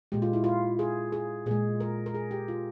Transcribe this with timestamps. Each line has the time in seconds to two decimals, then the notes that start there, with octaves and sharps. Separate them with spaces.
0.12 A#2 G#3 G4
0.22 F4
0.33 E4
0.44 F4
0.79 G#4
1.12 G#4
1.46 A#2 G#3 G#4
1.80 A#4
2.06 A#4
2.14 G#4
2.31 G4
2.48 F4